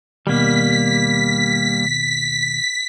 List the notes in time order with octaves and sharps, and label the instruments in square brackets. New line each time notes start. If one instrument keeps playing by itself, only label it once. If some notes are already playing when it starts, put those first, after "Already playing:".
[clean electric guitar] D#2 B2 [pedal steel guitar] G3 A#3 [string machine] B6